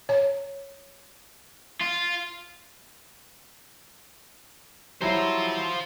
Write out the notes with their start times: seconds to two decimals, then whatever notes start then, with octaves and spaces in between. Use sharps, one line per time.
0.09 C#5
1.81 F4
5.02 F#3 G3 E4 F4 C5